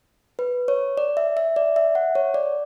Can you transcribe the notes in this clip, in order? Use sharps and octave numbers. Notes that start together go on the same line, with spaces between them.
B4
C#5
D5
E5
E5
D5
E5
F#5
C#5
D5